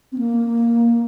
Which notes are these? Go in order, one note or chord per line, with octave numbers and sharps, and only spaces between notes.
C4
A#3